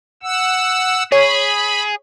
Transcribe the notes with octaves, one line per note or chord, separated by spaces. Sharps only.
F#5 E6
G#4 C#5 B5